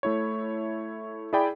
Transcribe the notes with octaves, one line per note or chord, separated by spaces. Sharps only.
A3 E4 C#5
E4 G#4 D5 G5 B5